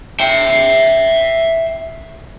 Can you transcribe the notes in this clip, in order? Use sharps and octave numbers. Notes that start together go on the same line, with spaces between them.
E5 G5